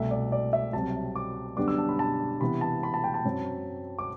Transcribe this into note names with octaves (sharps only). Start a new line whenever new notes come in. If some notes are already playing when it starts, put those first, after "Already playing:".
Already playing: C2 B2 A3 E5
D5
D5
E5
C2 C3 F#3 C4 A5
D6
F#2 D3 G3 B3 D4 D6
E6
A5
B5
A5
C3 E3 B3 B5
A5
B5
A5
G5
A5
F#2 F#3 C4
D6